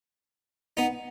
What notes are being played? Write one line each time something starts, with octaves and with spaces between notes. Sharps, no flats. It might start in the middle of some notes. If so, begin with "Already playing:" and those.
B3 D#4